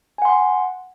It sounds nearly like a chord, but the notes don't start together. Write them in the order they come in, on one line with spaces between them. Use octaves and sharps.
G#5 F#5 C6